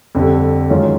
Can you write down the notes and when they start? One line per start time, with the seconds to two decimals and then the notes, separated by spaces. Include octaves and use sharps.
0.15 F2 D3 G3
0.70 F#2 D#3 G#3 C#4 F4